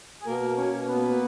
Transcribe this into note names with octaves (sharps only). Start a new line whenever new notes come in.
G#4
B2 A#3 A#4
A#3
C#4 C#5
B2
B3 B4
A#3